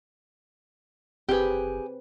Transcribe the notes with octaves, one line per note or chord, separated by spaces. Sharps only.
F#1 C4 G4 G#4 B4